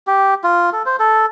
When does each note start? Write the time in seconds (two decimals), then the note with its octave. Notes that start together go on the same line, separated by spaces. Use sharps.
0.07 G4
0.44 F4
0.73 A4
0.86 C5
1.00 A4